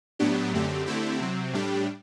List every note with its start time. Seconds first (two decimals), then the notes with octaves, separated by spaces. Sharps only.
0.19 A2 F#3 B3 D4 G4
0.53 F#2 D3 A3 C4 G4
0.86 D3 A3 C4 E4 G4
1.19 C3 F#3 C4
1.53 A2 G3 D4 G4